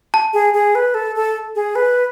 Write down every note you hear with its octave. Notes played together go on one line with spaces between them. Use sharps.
A5
G#4
G#4
B4
A4
A4
G#4
B4